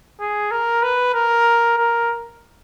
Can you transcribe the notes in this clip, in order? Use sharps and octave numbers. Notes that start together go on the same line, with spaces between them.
G#4
A#4
B4
A#4
A#4